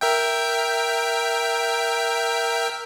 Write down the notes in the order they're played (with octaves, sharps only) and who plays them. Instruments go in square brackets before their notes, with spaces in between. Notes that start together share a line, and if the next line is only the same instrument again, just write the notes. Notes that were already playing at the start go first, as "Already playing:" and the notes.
[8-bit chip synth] A#4 E5 G5